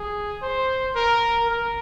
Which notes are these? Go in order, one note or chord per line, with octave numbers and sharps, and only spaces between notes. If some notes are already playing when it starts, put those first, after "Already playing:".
Already playing: G#4
C5
A#4
A#4